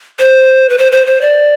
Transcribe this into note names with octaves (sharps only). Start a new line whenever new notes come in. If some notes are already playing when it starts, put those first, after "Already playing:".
C5
B4
C5
C5
C5
D5